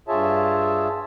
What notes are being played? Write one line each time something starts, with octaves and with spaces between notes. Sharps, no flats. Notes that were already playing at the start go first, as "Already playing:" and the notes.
G2 F4 G#4 C#5 E5 A5